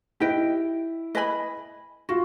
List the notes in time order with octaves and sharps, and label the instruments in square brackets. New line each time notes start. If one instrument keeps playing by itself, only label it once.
[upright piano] E4 [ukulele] G4 B4 D#5 G5
[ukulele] B4 D#5 G#5 B5
[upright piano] F4 [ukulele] F#4